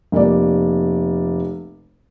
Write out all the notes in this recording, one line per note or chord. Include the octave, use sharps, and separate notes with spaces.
F1 A#3 D5